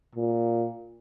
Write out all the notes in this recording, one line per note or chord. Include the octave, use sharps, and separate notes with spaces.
A#2